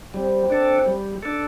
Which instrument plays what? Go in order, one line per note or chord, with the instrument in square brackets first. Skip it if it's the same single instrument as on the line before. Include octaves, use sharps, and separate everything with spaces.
[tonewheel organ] G3 [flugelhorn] C4
[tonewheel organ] D4 A4
G3
D4 A4